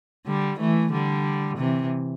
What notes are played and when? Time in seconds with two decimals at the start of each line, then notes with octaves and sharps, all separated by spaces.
0.27 D3 G3
0.59 E3 A3
0.92 D3 G3
1.58 C3 E3